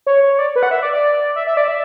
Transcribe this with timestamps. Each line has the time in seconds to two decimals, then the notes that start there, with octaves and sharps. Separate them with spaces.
0.07 C#5
0.23 C#5
0.39 D5
0.56 B4
0.63 F#5
0.71 E5
0.83 D5
0.93 D5
1.36 E5
1.47 E5
1.57 D5
1.68 E5